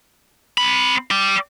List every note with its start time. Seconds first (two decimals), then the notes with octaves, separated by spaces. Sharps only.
0.58 C4 B5
1.11 D5 G5